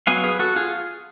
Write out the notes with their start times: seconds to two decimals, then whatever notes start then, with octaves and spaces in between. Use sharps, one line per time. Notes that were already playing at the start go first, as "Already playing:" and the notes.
0.07 F#3 B3 F5 G#5
0.24 G#4 B4
0.39 F#4 A4
0.56 F4 G#4